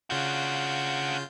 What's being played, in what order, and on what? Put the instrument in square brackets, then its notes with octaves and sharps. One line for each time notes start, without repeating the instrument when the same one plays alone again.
[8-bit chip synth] C#3 F4 G6 [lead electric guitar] D4 F#4